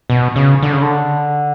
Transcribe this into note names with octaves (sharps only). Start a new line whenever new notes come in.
B2
C#3
D3
C#3
D3